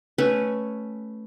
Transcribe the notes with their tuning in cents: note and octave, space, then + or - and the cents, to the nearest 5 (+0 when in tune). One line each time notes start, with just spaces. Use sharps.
A3 +0 C#4 +0 B4 +0